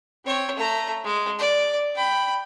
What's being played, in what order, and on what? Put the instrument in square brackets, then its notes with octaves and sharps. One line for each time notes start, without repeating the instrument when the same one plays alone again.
[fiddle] C4 C#5
A3 A#5
G#3
D5
G5 B5